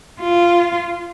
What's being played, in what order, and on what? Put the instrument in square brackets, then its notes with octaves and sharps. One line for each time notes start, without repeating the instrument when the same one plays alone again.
[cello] F4